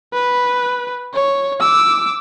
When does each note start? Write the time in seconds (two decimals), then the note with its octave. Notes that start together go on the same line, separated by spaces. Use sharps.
0.13 B4
1.14 C#5
1.61 D6 E6